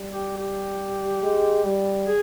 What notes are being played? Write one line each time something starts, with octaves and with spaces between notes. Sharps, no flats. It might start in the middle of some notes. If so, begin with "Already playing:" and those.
Already playing: G3
G4
G4
G#3
G3
G#4